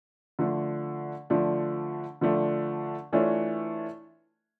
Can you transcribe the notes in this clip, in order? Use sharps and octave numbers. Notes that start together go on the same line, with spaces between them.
D3 F3 A3 D4
D3 F3 A3 D4
D3 F3 A3 D4
E3 A3 D4 F4 C#5